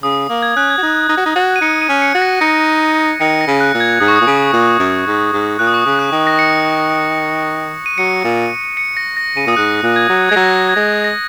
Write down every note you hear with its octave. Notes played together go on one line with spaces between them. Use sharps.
C#3 D#6
A#3
G#6
C#4 F#6
G#6
F#4
D#4
D#4
F#4
D#4
F#4
D#7
D#4 C#7
D#7
C#4
C#7
F#4
A#6
D#4 C#7
D#3 C#7
A#6
C#3
F#6
A#2
G#6
G#2 D#6
C#6
D#6
A#2
C#3
A#2
F#2
G#2
G#2
A#2 F#6
D#6
C#6
C#3 D#6
F#6
D#3
A#6
C#7
D#7
F#3 C#7
A#2
C#7
A#6
A#6
C#3 D#7
A#2 D#6
G#2 F#6
A#2 F#6
G#6
F#3
G#3 G#6
F#3 A#6
G#6
G#3 A#6
A#6